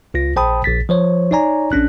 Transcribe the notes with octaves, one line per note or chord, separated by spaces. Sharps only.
C#2 F4 A#6
A#1 C5 G5 A5 B5 D#6
A#1 A6 B6
F3 C5 C#5
D#4 C#5 D5 G#5 A#5
A#1 C#4 D4 F#6